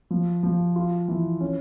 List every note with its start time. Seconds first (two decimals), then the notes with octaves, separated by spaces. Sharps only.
0.10 F3
0.43 F3
0.76 F4
1.08 E3
1.41 C#4